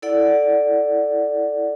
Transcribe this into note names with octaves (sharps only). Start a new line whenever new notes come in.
E4 A4 D5 F#5